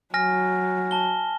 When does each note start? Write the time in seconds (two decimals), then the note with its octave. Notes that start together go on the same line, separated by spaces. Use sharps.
0.14 F#3 G#5 F6 A#6
0.91 A5 G7